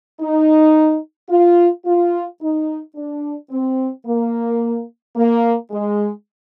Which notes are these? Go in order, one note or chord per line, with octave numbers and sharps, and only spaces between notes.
D#4
F4
F4
D#4
D4
C4
A#3
A#3
G#3